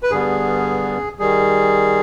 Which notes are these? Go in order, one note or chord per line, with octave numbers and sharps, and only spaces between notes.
B4
G2 D3 G3 B3 G#4
D#3 G3 G#4